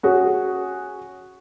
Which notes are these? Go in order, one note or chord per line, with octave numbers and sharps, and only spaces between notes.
C#4 F#4 G#4